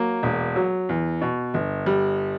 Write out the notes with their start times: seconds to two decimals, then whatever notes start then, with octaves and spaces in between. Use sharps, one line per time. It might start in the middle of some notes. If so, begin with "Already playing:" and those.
Already playing: F#3 A#3
0.23 E1
0.56 F#3
0.89 E2
1.21 B2
1.54 G1
1.86 G3